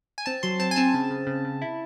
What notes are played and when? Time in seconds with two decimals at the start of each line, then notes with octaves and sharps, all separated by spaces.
0.18 G#5
0.26 C4 A5
0.43 F#3 C6
0.59 C4 A5
0.71 G#5
0.76 C4 A5
0.94 C#3
1.11 C#3
1.27 C#3
1.44 C#3
1.62 E4